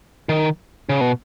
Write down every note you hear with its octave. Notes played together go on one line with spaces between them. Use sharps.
D#3
C#3
B2